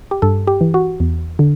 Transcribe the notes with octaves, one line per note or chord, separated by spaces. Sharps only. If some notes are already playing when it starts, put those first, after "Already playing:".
G4
G2 A4
G4
E3
F#4
E2
D3